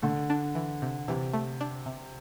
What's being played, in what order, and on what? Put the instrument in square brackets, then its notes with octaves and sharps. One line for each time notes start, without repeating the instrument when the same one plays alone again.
[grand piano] D3 [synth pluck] A3
[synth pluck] D4
E3
C3
[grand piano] C3 [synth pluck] E3
[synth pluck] A3
D4
C3